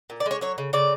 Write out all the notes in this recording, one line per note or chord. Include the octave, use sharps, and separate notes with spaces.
A#2
D5
G#3
C#5
F#3 C#5
C#3
C#3 D5